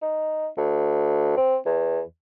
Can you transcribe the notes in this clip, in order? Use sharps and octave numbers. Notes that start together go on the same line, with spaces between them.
D#4
D2
C4
E2